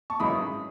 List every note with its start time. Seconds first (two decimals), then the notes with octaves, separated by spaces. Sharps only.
0.10 A5 C#6
0.20 G#1 F#2 E3 G#3 B5 D#6